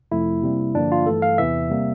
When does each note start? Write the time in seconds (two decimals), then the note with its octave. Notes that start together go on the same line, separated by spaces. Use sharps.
0.12 F2 C3 F3 A3 E4
0.43 C3 G3 A#3
0.75 G2 D3 F3 A#3 D4
0.92 F4
1.06 G2 E3 A3 A4
1.22 F5
1.38 E2 C3 E3 E5
1.70 C3 G3 A#3